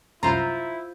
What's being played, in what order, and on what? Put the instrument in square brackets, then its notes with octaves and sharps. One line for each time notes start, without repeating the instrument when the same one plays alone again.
[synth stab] C2 F#2 A#5 [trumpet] E4 [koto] F4 C5